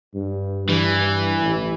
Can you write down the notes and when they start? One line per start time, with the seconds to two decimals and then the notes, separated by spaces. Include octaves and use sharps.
0.15 G2
0.69 G2 E3
1.41 A1